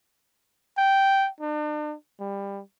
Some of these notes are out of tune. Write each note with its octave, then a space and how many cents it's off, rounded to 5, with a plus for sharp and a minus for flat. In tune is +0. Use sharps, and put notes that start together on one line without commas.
G5 -5
D4 +40
G3 +20